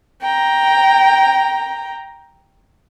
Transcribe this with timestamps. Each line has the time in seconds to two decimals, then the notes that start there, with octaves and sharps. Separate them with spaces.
0.22 G5 A#5